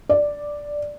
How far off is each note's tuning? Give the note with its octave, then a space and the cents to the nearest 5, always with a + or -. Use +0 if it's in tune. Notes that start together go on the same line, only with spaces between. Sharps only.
D5 +0